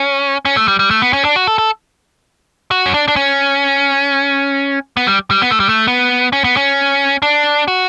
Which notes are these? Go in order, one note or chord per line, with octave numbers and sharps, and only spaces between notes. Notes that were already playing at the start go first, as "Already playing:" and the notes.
Already playing: C#4
C#4
A3
G3
G3
A3
B3
C#4
D4
F#4
A4
A4
F#4
C#4
D4
D4
C#4
B3
G3
G3
B3
A3
G3
A3
B3
C#4
B3
C#4
D4
F#4